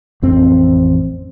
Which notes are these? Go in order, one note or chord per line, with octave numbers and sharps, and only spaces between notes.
A1 F2 C4